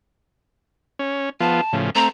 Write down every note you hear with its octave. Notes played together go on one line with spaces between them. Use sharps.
C#4
F3 B3 F4 A5
A2 C#3 F3
A3 C4 A#5